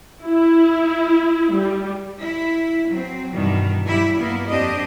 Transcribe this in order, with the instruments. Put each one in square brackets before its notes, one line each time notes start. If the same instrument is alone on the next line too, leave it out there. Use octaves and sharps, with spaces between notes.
[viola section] E4
G3
[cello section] E4
F#3 C4
G2 B2 D#3 E3 G3
G2 F#3 E4 G4
A#3 B3 E4
F2 C4 D4 G4 D#5